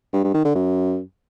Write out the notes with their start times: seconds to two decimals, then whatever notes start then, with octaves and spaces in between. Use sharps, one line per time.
0.13 G2
0.24 G2
0.34 D#3
0.45 D3
0.55 F#2